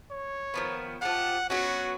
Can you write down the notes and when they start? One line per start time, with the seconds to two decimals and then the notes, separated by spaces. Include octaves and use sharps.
0.11 C#5
0.54 D#3 F3 B3
1.02 F3 A3 G4 F#5
1.50 F#3 B3 C#4 F#4